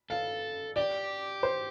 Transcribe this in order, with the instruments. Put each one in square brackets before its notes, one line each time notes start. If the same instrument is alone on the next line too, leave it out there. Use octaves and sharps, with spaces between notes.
[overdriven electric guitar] A4 [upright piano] F5
[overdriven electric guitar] G4 [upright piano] D5
[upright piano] C5